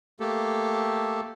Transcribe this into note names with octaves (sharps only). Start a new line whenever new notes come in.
A3 A#3 G4 A4